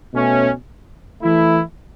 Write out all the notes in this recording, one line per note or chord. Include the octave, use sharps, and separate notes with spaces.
B2 A3 C#4
E3 A3 E4